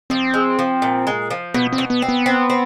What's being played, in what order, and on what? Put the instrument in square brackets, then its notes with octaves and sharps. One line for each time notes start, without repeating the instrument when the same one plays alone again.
[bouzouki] F3 [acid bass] C4
[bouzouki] G#3
F3
A#2
G#3
F3
[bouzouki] B2 [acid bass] B3
[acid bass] C4
[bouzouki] B2
[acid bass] B3
[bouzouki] C4
[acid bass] B3
[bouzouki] C4
C4